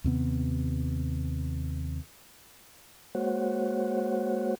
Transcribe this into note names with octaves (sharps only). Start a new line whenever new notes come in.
D#2 C3 B3
G#3 A#3 F#4 C5 C#5 F#5